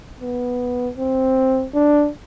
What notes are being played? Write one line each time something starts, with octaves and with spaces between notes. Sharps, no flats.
B3
C4
D4